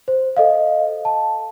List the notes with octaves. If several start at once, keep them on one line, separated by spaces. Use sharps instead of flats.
C5
A4 D#5 F5
A5